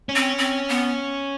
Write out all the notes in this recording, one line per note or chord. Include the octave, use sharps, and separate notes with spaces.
C#4
C4
C4
B3